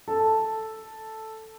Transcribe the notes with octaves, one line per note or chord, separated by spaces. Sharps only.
A4